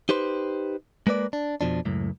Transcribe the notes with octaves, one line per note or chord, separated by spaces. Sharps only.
D#4 G4 B4 C5
G#3 A#3 B4 D5
D4
F2 B2 F3 D4
C#2 F#2 A2